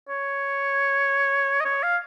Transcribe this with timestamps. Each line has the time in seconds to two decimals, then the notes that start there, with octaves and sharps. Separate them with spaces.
0.09 C#5
1.61 D#5
1.65 C#5
1.83 F5